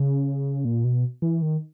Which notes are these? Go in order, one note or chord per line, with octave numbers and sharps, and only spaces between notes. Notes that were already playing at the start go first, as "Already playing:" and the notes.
Already playing: C#3
A#2
B2
E3
D#3